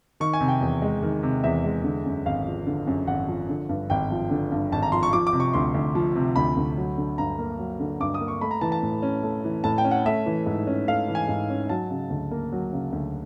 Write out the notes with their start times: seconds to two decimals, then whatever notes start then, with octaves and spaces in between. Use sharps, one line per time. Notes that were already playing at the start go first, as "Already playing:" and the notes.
0.20 D#3 C#6
0.33 G#5
0.40 C3
0.48 G5
0.61 E2
0.82 G#3
1.02 D#3
1.23 C3
1.44 E2 E5
1.64 G#3
1.84 D3
2.06 F#2
2.25 G#1 F5
2.47 F3
2.67 D3
2.87 F#2
3.07 G#1 F#5
3.28 F3
3.49 D3
3.69 G2
3.90 G#1 G5
4.11 F3
4.31 D3
4.52 G2
4.72 G#1 A5
4.83 A#5
4.92 F3 C6
5.03 C#6
5.13 F3 D6
5.27 D6
5.33 C3
5.40 C#6
5.54 D2 C6
5.74 D2
5.95 F3
6.15 C3
6.36 D2 B5
6.57 D2
6.77 F#3
6.98 D3
7.18 G2 A#5
7.39 A#3
7.59 F#3
7.80 D3
8.00 G2 D6
8.14 D#6
8.21 A#3
8.28 C#6
8.41 A3 B5
8.51 A#5
8.61 E3 A5
8.72 A5
8.83 A2
9.02 C#4
9.23 A3
9.44 E3
9.64 A2 A5
9.78 G5
9.84 C#4
9.91 F#5
10.06 A3 E5
10.26 E3
10.46 G#2
10.67 C#4
10.88 A3 F5
11.08 E3
11.15 G#5
11.28 G#2
11.50 C#4
11.69 F#3 A5
11.90 C#3
12.10 D2
12.31 A#3
12.52 F#3
12.73 C#3
12.93 D2